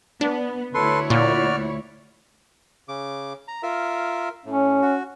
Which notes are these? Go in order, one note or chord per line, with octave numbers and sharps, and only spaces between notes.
B3 D4
D2 E4 A4 B4 C#5 C6
A#2 F#4 D5 F6
C#3 D6
A#5
F4 A#4 E5
A2 C#4
F#4